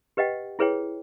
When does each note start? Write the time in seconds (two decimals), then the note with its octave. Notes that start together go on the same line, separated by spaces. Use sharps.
0.17 G4 B4 D#5 F#5 G5
0.59 E4 G#4 B4 C#5 G5